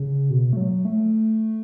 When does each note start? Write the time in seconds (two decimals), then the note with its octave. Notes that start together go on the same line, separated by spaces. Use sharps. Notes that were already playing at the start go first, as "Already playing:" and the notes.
Already playing: C#3
0.30 B2
0.53 A3
0.57 F#3
0.85 A3